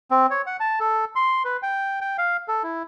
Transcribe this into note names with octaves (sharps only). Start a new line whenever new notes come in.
C4
C#5
F#5
A5
A4
C6
B4
G5
G5
F5
A4
E4